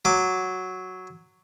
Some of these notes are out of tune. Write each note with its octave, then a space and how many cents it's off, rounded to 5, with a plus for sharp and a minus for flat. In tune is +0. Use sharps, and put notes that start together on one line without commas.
F#3 +0 D6 -5